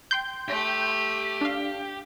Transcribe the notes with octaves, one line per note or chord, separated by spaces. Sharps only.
G5 C6 G6
A3 G4
D4 F5